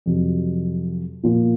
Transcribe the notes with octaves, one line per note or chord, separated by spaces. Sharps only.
F2 C3 F#3
A#2 F3 A#3